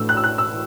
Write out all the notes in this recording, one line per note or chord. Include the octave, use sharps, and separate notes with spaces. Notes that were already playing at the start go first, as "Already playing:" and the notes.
Already playing: A1 A2 A3 D4 E6
F#6
E6
F#6
E6